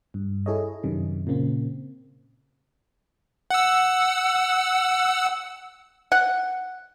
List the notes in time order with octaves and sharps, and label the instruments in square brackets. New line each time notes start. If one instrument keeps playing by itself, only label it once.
[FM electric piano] G2
E4 G#4 A4 C#5 D#5
F#2 C3 D#3
A#2 C#3 A#3 C4
[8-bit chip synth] F#5 E6
[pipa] F#5